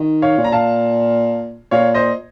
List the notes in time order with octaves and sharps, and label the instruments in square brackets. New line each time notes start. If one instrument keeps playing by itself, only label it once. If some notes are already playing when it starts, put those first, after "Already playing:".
Already playing: [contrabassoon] D#3
[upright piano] C#5 F5
[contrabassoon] A#2
[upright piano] A#5
F5 A5
[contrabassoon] A#2 [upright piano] C#5 F5
[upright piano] C5 D#5